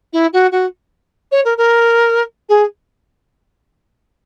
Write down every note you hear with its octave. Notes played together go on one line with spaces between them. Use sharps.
E4
F#4
F#4
C#5
A#4
A#4
G#4